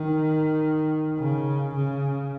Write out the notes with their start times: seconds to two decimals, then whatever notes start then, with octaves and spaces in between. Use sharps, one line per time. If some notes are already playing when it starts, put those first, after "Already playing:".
Already playing: D#3
1.19 C#3
1.74 C#3